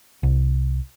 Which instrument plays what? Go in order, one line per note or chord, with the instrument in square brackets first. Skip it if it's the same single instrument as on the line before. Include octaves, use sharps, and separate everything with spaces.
[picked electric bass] C2